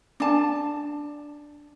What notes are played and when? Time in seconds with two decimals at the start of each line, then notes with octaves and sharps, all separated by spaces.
0.20 D4 A5